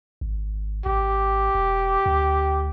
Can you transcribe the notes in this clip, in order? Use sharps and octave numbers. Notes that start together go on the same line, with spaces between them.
G#1
G#1 G4
E1
D2